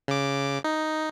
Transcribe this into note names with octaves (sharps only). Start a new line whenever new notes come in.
C#3 D6
D#4